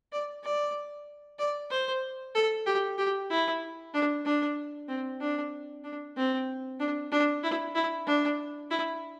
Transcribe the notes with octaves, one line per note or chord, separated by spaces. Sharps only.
D5
D5
D5
C5
A4
G4
G4
E4
D4
D4
C4
D4
D4
C4
D4
D4
E4
E4
D4
E4